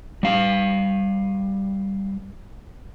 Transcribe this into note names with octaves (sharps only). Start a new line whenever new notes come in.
G3 F5